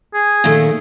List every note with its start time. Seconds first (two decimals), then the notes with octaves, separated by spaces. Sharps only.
0.14 G#4
0.44 A#2 D#3 A3